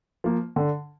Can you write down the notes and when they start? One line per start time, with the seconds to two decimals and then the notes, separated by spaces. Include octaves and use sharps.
0.24 F3 A#3
0.56 D3